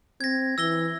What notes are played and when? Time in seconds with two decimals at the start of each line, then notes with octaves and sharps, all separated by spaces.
0.21 C4 G#6 A#6
0.58 E3 E6 A#6 G7